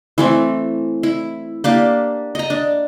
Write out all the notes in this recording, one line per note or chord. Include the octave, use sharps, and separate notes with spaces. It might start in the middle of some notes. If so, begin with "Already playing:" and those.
E3 A3 C4
E4
A#3 D4 G4
D#5 A#5
D4